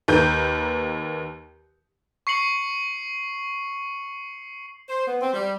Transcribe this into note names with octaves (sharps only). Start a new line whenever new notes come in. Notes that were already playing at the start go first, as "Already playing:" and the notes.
D#2 D#3 B4 G6
C#6 C7 C#7 F#7
C5
B3
C4
G3